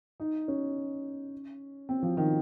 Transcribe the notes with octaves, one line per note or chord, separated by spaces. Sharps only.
D#4
C#4
C4
F3
D#3